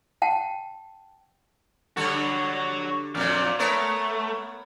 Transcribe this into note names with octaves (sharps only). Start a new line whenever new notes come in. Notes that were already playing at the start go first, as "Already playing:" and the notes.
F#5 G5 A5
D3 G3 F#4 A4 C#5
F2 A#2 F#3 D5 F5
A3 B3 A#4 C#5